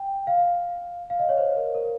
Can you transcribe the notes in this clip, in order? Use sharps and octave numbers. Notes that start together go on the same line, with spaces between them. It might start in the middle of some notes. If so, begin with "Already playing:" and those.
Already playing: G5
F5
F5
D#5
C#5
C5
A#4
A#4